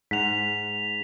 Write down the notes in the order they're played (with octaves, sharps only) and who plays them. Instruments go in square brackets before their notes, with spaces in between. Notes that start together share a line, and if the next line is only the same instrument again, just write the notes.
[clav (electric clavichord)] G#2 F#5 [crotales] B6 F7